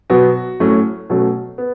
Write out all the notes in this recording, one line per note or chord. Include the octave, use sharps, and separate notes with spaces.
B2 F#3 B3 F#4
A2 F#3 A3 C#4
B2 F#3 A3 C#4
B3